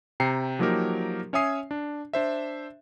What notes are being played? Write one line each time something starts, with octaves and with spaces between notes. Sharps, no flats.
C3 G5 A#5 C7 C#7
F3 F#3 A#3 D#4 G4 A#4
C#4 C#5 E5 G#5 D#6 C7
D4
D4 C5 E5